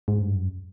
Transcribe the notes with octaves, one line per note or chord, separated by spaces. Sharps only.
G#2
G2
F#2